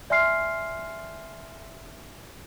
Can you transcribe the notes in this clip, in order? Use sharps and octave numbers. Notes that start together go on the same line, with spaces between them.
D5 E5 G#5 C6 F6 C7